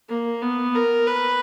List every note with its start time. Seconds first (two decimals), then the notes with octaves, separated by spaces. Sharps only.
0.09 A#3
0.42 B3
0.75 A#4
1.07 B4